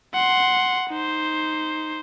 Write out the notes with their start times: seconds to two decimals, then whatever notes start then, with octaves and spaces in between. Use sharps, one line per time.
0.14 F#5 C6
0.90 D#4 C5